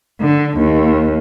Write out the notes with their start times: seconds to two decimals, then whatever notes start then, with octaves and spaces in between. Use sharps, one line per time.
0.21 D3
0.58 D#2